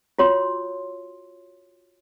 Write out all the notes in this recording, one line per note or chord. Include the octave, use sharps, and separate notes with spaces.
F4 F#4 C#5 C6